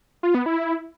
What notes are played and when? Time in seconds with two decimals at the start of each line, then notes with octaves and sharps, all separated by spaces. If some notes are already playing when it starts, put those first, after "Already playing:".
0.23 F4
0.35 B3
0.46 E4